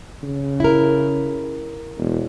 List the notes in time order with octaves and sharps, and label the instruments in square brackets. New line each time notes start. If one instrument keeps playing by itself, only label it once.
[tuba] C#3
[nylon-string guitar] E4 A#4
[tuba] E1